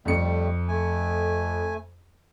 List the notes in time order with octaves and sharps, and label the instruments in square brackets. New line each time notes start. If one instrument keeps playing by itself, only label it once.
[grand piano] F2 C#7 [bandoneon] G3 A3
[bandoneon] A3 G#5